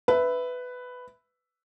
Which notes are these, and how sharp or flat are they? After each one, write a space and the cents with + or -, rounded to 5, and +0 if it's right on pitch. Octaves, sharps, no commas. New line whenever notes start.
B4 +10 E5 +0